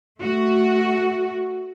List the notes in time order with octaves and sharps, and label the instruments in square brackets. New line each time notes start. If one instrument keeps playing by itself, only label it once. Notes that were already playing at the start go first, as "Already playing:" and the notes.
[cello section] A3 F#4